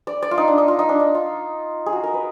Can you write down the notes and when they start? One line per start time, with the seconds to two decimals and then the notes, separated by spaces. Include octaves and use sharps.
0.07 D5
0.22 D5
0.31 F4
0.38 D#4
0.48 D4
0.58 D#4
0.68 F4
0.79 D#4
0.89 D4
1.00 D#4
1.15 F4
1.86 G#4
1.93 F#4
2.03 A#4
2.14 B4